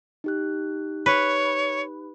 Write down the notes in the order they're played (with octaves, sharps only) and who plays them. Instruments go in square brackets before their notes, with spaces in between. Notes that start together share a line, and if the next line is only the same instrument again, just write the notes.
[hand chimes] D#4 G4 F#6
[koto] B4 [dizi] C#5